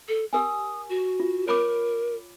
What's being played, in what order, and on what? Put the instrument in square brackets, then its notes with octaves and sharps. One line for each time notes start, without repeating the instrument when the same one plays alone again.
[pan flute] A4
[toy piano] G4 A#4 G#5 [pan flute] D#6
[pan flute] F#4
[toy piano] F4
[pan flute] A#4 [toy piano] C#5 B5 D6